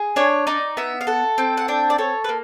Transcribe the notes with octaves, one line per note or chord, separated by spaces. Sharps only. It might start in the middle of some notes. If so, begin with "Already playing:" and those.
Already playing: G#4
D4 C#5
D#4 D5
B3 E5
F5
A4 F#5
C4 G5
F#5
D4 G5
D5
A4 C#5
B4
A#3